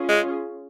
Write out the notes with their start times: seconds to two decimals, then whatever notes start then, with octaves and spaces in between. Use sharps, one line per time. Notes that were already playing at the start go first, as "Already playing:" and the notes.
Already playing: C#4 F4 G#4
0.09 G#3